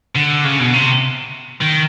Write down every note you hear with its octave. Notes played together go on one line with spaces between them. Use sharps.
D3
C#3
B2
C3
D#3